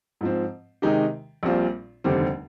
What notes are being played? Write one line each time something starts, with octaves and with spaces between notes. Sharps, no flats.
G#2 F3 C4
C3 D#3 G#3 D#4 G4
A#1 A#2 G3 C4 F4
F1 D#2 D3 G3 C4